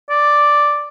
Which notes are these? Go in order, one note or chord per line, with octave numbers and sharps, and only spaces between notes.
D5